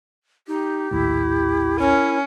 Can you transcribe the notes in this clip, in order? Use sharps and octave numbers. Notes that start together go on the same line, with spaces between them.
D#4 G4
A#1 D#2 A2 E4
C#4 A#4